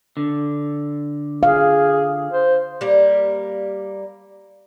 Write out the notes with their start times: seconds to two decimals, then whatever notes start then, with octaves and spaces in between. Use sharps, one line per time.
0.17 D3
1.43 G#4 F5
2.33 C5
2.81 G3 A#3